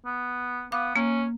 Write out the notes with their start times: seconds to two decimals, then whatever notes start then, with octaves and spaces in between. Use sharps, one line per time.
0.05 B3
0.72 B3 F5 D6
0.96 A#3 C#4